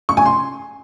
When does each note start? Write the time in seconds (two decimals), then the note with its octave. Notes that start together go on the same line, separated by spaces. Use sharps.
0.09 C#6
0.17 G#5
0.25 C6